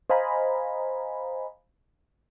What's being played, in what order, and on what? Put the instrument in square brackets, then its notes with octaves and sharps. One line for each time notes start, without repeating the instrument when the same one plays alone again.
[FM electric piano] C5 D#5 F5 G#5 A#5 B5